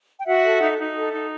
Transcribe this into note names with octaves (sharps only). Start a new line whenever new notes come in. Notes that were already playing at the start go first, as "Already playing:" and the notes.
G5
F#4 E5 F#5
A4
D#4
D#4
A4
D#4